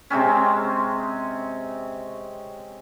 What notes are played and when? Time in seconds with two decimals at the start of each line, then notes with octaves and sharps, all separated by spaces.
0.10 C3 G#3 C4 C#4